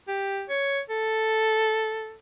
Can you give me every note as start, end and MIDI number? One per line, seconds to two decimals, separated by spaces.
0.08 0.44 67
0.49 0.80 73
0.90 2.16 69